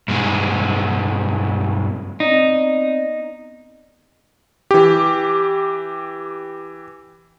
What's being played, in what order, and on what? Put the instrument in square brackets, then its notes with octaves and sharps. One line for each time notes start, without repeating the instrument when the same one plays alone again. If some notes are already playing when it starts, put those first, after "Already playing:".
[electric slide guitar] G2 B2 G#3
[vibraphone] B3 C4 D5 [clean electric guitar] D#4
[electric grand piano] E3 G4